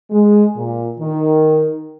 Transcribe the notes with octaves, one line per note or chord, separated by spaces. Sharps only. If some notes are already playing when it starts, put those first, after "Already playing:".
G#3
A#2
D#3